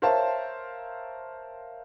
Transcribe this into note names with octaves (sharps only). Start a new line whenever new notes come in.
A#4 C5 C#5 E5 F5 A5